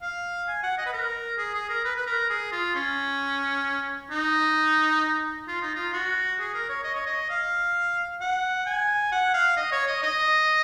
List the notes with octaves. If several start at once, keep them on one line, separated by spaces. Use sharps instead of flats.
F5
G#5
F#5
D#5
B4
A#4
G#4
G#4
A#4
B4
B4
A#4
G#4
F4
C#4
D#4
F4
D#4
F4
F#4
G#4
A#4
C#5
D#5
C#5
D#5
F5
F#5
G#5
F#5
F5
D#5
C#5
D#5
D#5